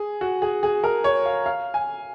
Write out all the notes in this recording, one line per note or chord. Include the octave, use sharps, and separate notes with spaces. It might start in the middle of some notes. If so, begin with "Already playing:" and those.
Already playing: G#4
F#4
G#4
G#4
A#4
C#5
F5
F5
G#5